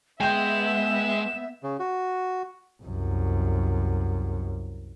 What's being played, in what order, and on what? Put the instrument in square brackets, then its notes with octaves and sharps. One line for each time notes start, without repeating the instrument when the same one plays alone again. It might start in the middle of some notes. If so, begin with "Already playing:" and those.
[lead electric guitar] G#3 [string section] B3 E5 [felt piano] G5 G6 [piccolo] E7
[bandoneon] C#3
F#4
[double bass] C2 F#2